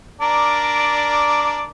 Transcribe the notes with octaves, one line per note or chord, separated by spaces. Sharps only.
D4 A#4 D5